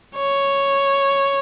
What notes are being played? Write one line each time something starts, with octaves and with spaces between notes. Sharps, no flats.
C#5